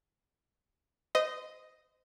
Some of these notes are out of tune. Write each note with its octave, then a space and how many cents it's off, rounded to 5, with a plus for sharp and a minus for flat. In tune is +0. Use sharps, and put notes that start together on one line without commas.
C5 -30 D#5 +0